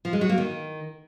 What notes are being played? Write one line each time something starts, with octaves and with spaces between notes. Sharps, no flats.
F3
G#3
F#3
A#3
D#3